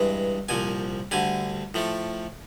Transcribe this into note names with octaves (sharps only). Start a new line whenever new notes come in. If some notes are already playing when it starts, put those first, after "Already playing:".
Already playing: G2 E3 G#3
C2 A#2 F3 G#5
D2 D3 G3 G#5
A2 F3 A3